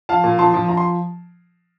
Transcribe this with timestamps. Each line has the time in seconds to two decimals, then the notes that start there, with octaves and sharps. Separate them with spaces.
0.09 F3 F5 A5
0.24 A#2
0.39 F3 A5 C6
0.54 F3
0.68 F3 A#5
0.77 C6